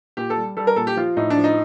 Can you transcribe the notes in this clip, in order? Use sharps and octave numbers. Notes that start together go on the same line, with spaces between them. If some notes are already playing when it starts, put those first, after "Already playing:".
A#2 G4
A4
G3
G3 A4
A#4
A#2 A4
G4
F3 F4
A2 D#4
D4
F3
D#4